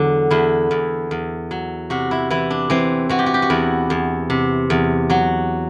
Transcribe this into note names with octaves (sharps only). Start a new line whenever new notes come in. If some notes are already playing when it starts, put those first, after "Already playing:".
Already playing: E2 D3 F#3
E2 E4
E2
E2
F#3
C3 F#4
E4
E3 E4
D4
E3 C4
E3 F#4
G4
F#4
G4
F#4
E2 E4
E2
C3
E2
F#3 F#4